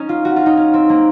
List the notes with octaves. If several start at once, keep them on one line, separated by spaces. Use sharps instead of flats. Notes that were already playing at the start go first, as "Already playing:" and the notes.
Already playing: C#4 D#4
F4
F#4
F4
D#4
C#4
C4
A#3